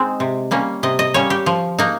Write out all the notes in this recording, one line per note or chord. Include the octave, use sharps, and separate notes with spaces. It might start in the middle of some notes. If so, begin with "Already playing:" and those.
Already playing: G#3 C4 D#4
C3
G3 A#3 C#4
C3 D#5
D#5
G3 A#3 C#4 C#5
G4
F3
A#3 D#4